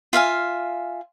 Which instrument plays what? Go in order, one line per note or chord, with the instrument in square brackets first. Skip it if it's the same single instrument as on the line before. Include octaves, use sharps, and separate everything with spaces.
[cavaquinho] F4 E5 F5 G#5